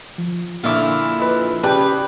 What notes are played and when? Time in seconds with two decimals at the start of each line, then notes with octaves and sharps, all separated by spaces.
0.18 F3
0.63 A#2 D3 E4 F4 D6
1.20 B4 D#5
1.63 C#3 G4 B4 D5 G5 A5